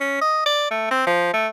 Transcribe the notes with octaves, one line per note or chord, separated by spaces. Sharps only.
C#4
D#5
D5
A3
C4
F3
A3